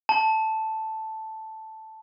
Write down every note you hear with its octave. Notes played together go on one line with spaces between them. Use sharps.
A5